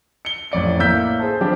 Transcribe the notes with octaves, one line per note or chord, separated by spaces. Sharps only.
C#7 G7
A1 F2 D5 C#7
A2 A#3 E6 G6 B6
G#4 C5 A5
F3 G3 C4 D4 G4